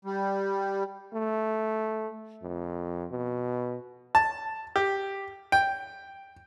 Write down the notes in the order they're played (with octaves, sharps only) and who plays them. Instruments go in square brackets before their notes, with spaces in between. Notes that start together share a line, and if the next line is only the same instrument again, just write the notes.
[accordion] G3
[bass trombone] A3
F2
B2
[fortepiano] A5
G4
G5